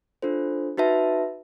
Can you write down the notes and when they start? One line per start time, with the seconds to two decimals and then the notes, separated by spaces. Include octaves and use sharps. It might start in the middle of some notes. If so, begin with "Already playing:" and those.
0.22 D4 F4 A4 C5
0.77 D#4 F#4 B4 E5 A5